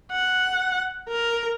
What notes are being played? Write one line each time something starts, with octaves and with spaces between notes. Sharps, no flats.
F#5
A#4